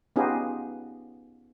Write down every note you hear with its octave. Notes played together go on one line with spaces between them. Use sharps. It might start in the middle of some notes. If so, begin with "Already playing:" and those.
B3 C#4 D#4 F4 G4 G#4